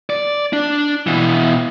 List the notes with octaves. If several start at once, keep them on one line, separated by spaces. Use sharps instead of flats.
D5
D4
B2 E3